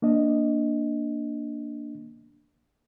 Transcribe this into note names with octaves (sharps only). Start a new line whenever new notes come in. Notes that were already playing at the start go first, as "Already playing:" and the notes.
A#3 D4 D#5